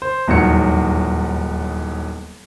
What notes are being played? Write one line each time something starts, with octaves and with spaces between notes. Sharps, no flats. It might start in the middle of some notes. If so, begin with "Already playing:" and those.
C5
D#1 E2 G#2 F#3 C#7